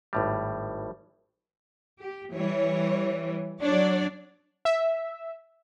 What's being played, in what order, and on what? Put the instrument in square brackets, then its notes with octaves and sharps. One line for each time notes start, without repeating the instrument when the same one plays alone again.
[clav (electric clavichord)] G#1 A2 G3
[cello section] G4
[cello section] E3 G3 [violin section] C#5
[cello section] F#3 D4 [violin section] C#5 D5
[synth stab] E5